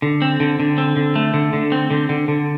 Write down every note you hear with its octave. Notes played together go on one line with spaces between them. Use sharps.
D3
C4
D3
D3
C4
D3
A3
D3
D3
C4
D3
D3
D3